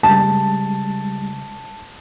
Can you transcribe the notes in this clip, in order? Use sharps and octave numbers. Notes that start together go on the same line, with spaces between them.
C#3 G3 G#3 A5